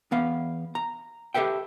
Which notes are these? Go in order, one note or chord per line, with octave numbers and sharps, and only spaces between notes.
E2 B3 F5
A#5
G4 A4 B4 E5 G5